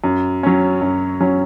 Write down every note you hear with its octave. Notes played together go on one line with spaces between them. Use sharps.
F#2
F#3 C#4
F#2
F#3 C#4